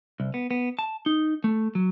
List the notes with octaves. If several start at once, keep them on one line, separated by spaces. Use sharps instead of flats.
C2
B3
B3
A5
D#4
A3
F#3